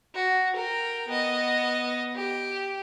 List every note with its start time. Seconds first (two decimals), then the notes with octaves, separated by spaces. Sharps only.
0.14 F#4
0.55 A#4 G5
1.08 B3 D#5
2.15 G4